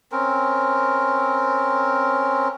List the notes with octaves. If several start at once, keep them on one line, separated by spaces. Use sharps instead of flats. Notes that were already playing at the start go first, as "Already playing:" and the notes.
C4 C#4 A#4